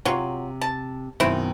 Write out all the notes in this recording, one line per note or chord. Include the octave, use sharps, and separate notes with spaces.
C3 F#3 F4
A5
F#2 B2 D#3 C4 E4